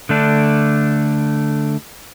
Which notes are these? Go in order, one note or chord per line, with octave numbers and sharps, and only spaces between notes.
D3 A3 D4